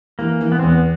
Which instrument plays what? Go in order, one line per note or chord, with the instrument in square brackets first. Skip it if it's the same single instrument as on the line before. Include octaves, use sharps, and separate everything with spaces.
[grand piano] E3 [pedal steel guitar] A#3
[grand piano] E3
[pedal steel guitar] B3
[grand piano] E2 [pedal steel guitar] C4
[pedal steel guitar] B3